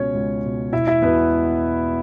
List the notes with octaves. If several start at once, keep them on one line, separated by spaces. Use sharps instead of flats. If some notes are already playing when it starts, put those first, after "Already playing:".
Already playing: C#2 B2 C#4 C#5
C#2
B2
E1 E4 E5
E4 E5
E2 B2 B3 B4